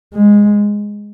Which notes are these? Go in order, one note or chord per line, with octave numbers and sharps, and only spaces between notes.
G#3